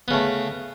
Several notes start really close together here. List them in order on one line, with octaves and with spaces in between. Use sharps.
B3 C#3 A3